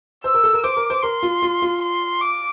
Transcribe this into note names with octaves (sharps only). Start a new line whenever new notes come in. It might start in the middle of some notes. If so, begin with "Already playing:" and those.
C5 E6
A#4
A4
A#4
C5 D6
A#4
C5
A#4 C6
F4
F4
F4
C6
D6